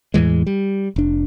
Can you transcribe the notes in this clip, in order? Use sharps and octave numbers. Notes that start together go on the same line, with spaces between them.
E2 A2 E3 G#3
G3
F1 D4